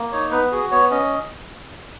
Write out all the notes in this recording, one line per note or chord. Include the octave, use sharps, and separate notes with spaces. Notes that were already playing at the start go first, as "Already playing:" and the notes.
Already playing: A#3
D#4 C#5
B3 B4
F#4 G#4
B3 C#5
C#4 D#5